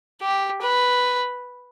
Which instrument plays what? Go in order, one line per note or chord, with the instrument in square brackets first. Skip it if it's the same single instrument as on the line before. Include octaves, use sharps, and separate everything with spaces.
[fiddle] G4
B4